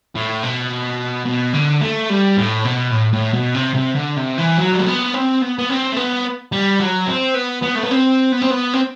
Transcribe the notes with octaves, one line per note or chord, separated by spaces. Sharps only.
A2
B2
B2
D3
A3
G3
A2
B2
A2
A2
B2
C3
C3
D3
C3
E3
F#3
G3
A3
B3
C4
B3
B3
C4
A3
B3
G3
F#3
C4
B3
B3
A3
B3
C4
B3
C4
B3
C4